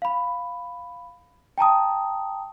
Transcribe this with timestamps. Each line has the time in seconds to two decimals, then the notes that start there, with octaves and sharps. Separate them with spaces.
0.02 F5 B5
1.58 G5 A5 A#5 D#6